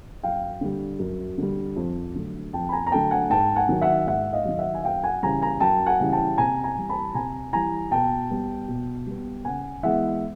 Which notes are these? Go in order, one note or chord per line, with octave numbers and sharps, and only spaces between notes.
F#2 F5 G5
D3 G3
F#2
D3 G3
F2
D3 F#3 A3
F2 G5 A5
B5
G#5 A#5
A#5
D3 F#3 A3 G5 A5
F#5 G#5
G#2 G5 A5
F#5 G#5
D#3 F#3
E5 F#5
G#2 E5 F#5
D#5 F5
D#3 F#3
E5 F#5
G#5
F#2 F5 G5
F#5 G#5
C#3 E3 G3 G#5 A#5
G#5 A#5
F#2 G5 A5
F#5 G#5
C#3 E3 G3
G5 A5
C3 G#5 A#5
G#5 A#5
E3 G3
A5 B5
C3 G#5 A#5
E3 G3 G#5 A#5
B2 G5 A5
G3 B3
B2
G3 B3
C#3 F#5 G#5
E3 G#3 B3 E5 F#5